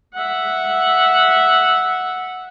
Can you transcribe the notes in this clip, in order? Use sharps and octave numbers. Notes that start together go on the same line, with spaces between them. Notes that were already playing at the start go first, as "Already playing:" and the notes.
E5 F#5